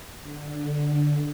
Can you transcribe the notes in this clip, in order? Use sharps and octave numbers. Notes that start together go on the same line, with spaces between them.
D3